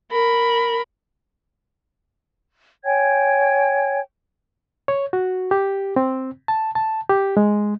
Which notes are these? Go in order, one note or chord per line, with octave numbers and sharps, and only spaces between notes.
A#4 B5
C#5 G5 G#5 G#6
C#5
F#4
G4
C4
A5
A5
G4
G#3